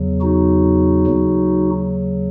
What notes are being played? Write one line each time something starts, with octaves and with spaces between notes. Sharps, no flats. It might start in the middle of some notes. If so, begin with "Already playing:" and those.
Already playing: E2 C#3 F#3
D#4 F#4
D#2 C#3 F#3